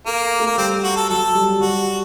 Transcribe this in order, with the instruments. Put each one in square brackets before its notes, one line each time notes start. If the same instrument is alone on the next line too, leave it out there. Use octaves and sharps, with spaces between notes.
[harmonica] A#3 [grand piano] A4
[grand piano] A3
[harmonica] A#3
[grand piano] G3 [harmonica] C4
[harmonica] F#4
A4
[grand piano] F#3 [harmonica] A4
[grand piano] G3
[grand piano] G3 [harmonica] F#4